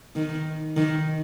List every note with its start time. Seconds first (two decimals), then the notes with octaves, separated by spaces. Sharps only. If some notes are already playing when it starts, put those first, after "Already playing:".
0.16 D#3
0.77 D#3